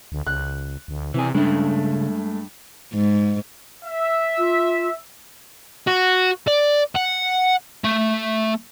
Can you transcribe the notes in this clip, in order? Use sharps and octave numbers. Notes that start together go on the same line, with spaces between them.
D2
C#2 F#6
D2
C3 E3 G#4
G2 C#3 G#3 A3
G#2
E5
F4
F#4
D5
F#5
A3